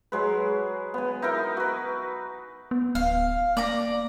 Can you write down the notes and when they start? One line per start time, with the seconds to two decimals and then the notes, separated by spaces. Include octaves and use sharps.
0.12 F#3 G#3 B4
0.94 B3 G#5
1.22 D#4 E4 A#4 D#5
1.57 F#4 B4
2.71 B3
2.95 D1 F5
3.57 A#3 D5 A#5